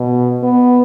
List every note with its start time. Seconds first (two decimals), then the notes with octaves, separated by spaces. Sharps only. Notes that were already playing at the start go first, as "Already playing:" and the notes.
Already playing: B2
0.43 B3